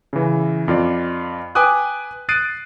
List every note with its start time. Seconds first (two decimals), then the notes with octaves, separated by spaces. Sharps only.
0.13 C#3 E3
0.68 F2 F4 D5
1.55 B4 G5 G#5 D6 D#6 F#6
2.29 D#6 F#6 A6 C7 D7 D#7